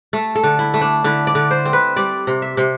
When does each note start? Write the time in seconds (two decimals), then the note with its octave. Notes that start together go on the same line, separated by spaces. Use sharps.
0.13 A3 A4
0.36 A4
0.43 D3
0.59 E4
0.74 A3
0.81 D4
1.04 D3 E4
1.27 D5
1.35 D3
1.51 C5
1.65 C4
1.73 B4
1.96 G3 D5
2.27 C3
2.42 E5
2.57 C3